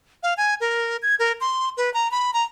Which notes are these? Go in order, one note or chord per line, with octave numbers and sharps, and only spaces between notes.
F5
G#5
A#4
G#6
A#4
C6
B4
A#5
B5
A#5